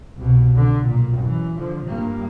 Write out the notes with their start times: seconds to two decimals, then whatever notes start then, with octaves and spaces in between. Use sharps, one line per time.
0.17 C2 B2
0.56 D3
0.86 B1 A#2
1.19 F#2 E3
1.57 D3 F3
1.87 G2 A#3